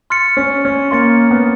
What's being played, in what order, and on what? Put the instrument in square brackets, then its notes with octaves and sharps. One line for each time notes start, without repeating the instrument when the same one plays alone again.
[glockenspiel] C6 F6 A6 C#7
[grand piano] C#4
C#4
[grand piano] A#3 [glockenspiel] C6 F6 A6 C#7
[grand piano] B3